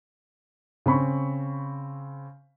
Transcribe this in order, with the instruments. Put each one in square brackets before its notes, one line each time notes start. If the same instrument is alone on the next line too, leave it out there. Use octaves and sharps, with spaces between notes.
[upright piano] C#3 C4 B5 C#6